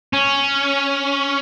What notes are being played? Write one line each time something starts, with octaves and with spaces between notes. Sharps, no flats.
C#4